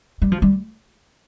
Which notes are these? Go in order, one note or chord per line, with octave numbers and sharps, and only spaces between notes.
G3
F3
G3